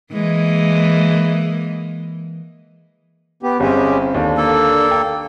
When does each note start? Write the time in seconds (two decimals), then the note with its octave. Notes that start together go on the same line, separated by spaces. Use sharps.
0.12 E3 G#3 A#3
3.43 B3 G4
3.60 G1 G#3 C4 C#4 G4
4.14 D#2 D3 D4
4.37 A#3 A4
4.91 G5